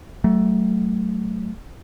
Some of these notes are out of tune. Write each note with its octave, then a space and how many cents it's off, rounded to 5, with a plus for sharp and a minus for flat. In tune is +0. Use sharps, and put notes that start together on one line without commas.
F#3 +30 A3 +0